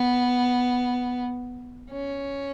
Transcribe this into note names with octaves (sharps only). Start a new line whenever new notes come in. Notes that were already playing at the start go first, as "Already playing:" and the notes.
Already playing: B3
C#4